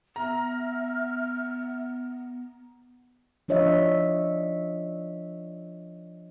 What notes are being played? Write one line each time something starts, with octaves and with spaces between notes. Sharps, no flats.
B3 E5 A#5 F6
F3 D4 F4 C#5 D#5 E5